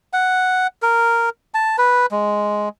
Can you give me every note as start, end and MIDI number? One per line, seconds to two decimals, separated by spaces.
0.13 0.67 78
0.82 1.29 70
1.54 1.76 81
1.78 2.06 71
2.11 2.69 56